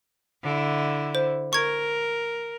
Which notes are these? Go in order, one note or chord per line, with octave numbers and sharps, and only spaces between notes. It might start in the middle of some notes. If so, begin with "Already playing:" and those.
D3 E4
C5
A#4 C#6 G#6